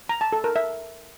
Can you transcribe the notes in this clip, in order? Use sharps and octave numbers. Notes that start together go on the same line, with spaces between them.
A#5
A5
A4
A#4
E5